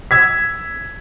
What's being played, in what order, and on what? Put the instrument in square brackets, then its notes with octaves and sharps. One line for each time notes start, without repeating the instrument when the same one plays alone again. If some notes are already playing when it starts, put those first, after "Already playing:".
[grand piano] E6 G#6 B6